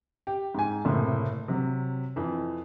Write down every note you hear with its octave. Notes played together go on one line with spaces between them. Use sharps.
G4
G#2 G#5
F#1 A2 C3
C3 F#3
F2 E3